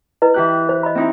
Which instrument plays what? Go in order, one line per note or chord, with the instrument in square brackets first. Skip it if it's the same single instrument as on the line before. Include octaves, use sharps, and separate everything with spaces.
[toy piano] E4 B4 D#5
[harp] E3 G4 F#6
[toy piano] C5
D#5 B5
[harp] C4 D#4 E4